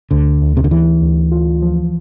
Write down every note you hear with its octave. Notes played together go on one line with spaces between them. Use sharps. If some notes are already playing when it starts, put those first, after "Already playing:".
D2 D3
D2
C3
D3
D2 E3
D2
F4
F3